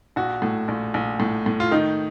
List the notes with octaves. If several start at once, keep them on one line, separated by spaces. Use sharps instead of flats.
A#1 F#4
A2
A#1
A#1
A2
A2
F4
D#3 D#4